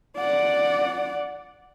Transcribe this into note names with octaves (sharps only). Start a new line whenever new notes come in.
D5 F#5